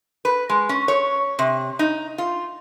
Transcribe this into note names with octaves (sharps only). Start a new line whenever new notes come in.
B4
G#3
C#4
C#5
C3
D#4
F4